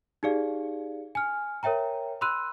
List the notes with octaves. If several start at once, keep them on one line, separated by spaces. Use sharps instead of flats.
D#4 G4 G#4 D5 F5
G#5 F6
A#4 C#5 E5 G5 A#5
B5 C6 E6 F#6 D#7